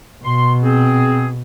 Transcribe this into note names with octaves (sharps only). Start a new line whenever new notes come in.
B2 C6
C4 G#4